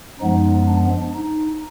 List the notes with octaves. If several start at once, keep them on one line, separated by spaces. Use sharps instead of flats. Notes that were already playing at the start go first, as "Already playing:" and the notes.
F#2 F3 G#3 B3 D#4
D4
D#4